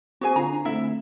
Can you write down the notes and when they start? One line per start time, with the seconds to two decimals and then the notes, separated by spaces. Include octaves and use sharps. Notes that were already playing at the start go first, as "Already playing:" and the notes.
0.21 C4 F#4 G#4 C5 G#5
0.36 D3 F4 A#5 C7
0.53 D4
0.65 D3 A3 C4 E4 E5